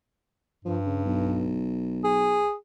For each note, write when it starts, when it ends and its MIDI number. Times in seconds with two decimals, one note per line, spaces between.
0.65 1.62 43
0.65 0.78 53
0.86 1.03 49
1.05 2.47 35
2.04 2.54 68